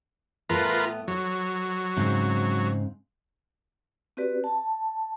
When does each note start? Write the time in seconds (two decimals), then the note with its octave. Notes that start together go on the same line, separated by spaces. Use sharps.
0.49 A2 A3 B3 F4 A#4 B4
1.08 F#3 C#5
1.97 G#2 C#3 C4
4.17 C4 F#4 G4 B4 D5
4.44 A5